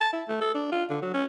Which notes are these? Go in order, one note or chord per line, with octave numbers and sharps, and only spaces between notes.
A5
E4
A3
A4
D4
F4
D3
F#3
C#4